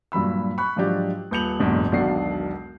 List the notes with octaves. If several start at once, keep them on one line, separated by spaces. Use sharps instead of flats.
G2 A#2 F#3 B5 E6
B5 C#6 F#6
G#2 F3 F#3 D4 G4
D#1 B4 G6 C#7 F7 F#7
F#1 E2 G#2 B2 D3
E1 B1 D#3 D4 F#5 C7